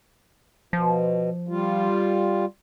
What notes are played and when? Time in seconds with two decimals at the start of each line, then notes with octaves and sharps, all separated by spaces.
0.73 B2 F3
1.48 G3 F4